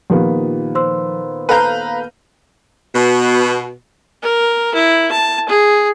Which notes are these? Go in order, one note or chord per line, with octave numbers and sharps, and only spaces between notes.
A#2 D#3 F3 B3 G4
C5 C6 E6
A4 B4 F5 A#5 G6
B2
A#4
E4
A5
G#4